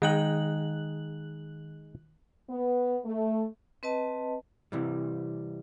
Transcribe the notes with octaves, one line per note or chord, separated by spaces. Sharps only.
D#3 G#3 D#4 G5 F#6 F#7
B3
A3
C4 B4 D#5 A5
C3 E3 G3